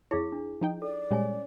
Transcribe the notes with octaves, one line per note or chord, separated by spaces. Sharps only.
F2 E4 G#4 C#5 F5
D4
F3 D#4 G5
A4 D5
A#2 G3 G#3 C#4 C#5 G#5